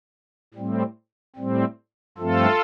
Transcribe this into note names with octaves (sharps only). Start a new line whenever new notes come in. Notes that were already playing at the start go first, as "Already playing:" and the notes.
A2 G3 C4
A2 G3 C4
G2 F3 A3 C4 F4 A4